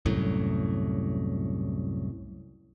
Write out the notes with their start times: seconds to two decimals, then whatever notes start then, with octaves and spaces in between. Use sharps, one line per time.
0.06 C2 F#2 A2